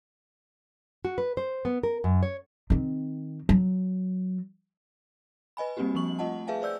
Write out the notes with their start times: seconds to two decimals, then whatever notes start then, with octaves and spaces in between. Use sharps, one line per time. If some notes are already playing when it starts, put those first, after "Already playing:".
1.05 F#4
1.18 B4
1.37 C5
1.65 B3
1.83 A#4
2.04 F#2
2.23 C#5
2.70 D#3 C4
3.49 F#3
5.57 B4 D#5 G#5 B5
5.77 G3 A#3 C4 D4 F#4 G4
5.95 F3 A#3 C4 C#6 F#7
6.19 A3 F4 D#5 F#5 A5
6.47 G#4 B4 E5 F5 G#5 A5
6.62 C5 D5 E6 G6